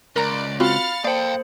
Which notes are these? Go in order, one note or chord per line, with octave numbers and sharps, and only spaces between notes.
C#2 A#4 D5 A#5
C4 F4 F#4 F5 B5 F6 A6 C#7
A#3 A4 C5 D5 F5 G5